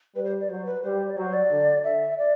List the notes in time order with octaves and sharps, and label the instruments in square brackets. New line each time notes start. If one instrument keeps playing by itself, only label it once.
[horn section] G3 [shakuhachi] B4
[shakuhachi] C5
D5
[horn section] F#3 [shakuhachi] C5
[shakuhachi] B4
[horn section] G3 [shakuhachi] C5
[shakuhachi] D5
[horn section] F#3 [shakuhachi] C5
[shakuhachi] D5
[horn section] D3
[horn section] D3 [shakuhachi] E5
[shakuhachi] D5